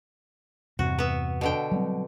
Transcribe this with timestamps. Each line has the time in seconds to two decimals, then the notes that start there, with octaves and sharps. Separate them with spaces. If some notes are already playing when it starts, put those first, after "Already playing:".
0.79 E2 G2 C3 F#4
0.99 B3 E5
1.41 B2 D3 G5
1.72 F#3 G3 C4